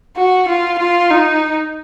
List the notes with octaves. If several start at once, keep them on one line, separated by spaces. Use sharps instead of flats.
F#4
F4
F4
D#4